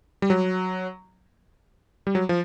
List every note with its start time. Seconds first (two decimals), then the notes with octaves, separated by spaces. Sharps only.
0.22 G3
0.30 F#3
2.07 G3
2.15 F#3
2.29 F3